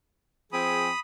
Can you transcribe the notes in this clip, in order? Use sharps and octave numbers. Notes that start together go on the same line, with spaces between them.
F3 C4 G#4 B5 D#6